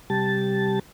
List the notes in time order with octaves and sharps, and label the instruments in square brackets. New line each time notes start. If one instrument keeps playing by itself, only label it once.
[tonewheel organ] C3 G3 G4 A5 A6